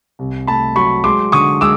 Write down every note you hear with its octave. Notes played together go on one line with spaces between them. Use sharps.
C2
A3 A5 B5
F#3 B5 C#6
G#3 C6 D6
D3 C#6 D#6
G#3 D6 E6